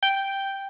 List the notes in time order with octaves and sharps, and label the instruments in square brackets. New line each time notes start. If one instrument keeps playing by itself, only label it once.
[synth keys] G5